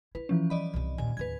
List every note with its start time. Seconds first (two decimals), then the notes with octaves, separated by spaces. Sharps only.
0.15 E4 B4
0.29 E3 F3 C#4
0.50 G3 D5 D#5 B5
0.74 C2 C3
0.98 D#2 A#2 G#5
1.17 D1 D#2 B4 G#6